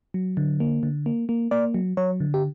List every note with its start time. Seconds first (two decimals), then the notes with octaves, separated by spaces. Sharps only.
0.14 F#3
0.37 D3
0.60 A#3
0.83 D3
1.06 A#3
1.29 A#3
1.51 A#3 D5
1.74 F#3
1.97 F#3 C#5
2.20 D3
2.34 G4